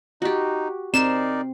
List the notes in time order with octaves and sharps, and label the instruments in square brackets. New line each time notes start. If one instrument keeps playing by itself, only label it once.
[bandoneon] D#4 [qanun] F#4 G4
[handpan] C4 [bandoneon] D#4 A#4 D5 [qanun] C6 [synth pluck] E7